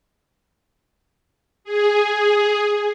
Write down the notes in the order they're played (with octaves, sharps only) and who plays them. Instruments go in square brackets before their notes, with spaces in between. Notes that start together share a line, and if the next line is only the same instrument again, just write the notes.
[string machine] G#4